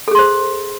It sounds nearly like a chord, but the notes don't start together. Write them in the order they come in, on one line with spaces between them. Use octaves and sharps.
A4 G#4 C6 C5